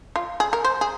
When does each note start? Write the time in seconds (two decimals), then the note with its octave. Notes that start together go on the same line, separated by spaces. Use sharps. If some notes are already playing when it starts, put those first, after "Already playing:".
0.16 F4
0.40 G#4
0.53 A#4
0.64 C5
0.81 G#4